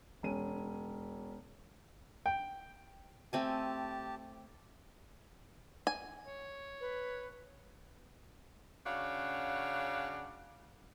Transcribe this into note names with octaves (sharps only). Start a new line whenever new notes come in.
E1 C#4 D#7
G5
A3 C4 G4 G#5 A5
G#5
C#5
B4
C#3 D4 F#4 C#5 F5